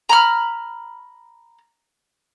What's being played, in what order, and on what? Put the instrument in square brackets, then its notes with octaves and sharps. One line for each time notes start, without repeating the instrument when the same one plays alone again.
[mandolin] A#5 B5 F6